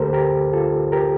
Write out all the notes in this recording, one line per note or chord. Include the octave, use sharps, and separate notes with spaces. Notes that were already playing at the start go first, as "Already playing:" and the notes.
Already playing: D2 D3 A3 G4 A4 A#4 C5
G4 A#4
F4 A4
G4 A#4